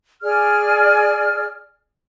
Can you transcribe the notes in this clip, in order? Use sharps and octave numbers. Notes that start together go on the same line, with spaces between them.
G#4 D5 F6